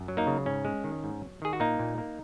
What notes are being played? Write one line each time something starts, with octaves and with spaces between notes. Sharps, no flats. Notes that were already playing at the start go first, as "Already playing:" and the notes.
Already playing: F#2
F#3
A#3 D#4
C#3
G#2 C#4
G#3
D#3
G#2
F#3
D#3 G#4
F#4
A#2 A#3 D#4
A#2
A#3